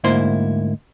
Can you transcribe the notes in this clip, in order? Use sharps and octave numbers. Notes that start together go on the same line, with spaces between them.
D2 G#2 A#3 E4 C5 C6